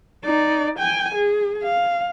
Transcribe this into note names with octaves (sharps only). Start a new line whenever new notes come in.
D#4 D5
G5 G#5
G#4
F5